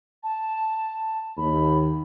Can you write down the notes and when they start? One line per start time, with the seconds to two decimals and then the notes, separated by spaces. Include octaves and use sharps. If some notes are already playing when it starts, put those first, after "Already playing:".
0.23 A5
1.37 D#2 B5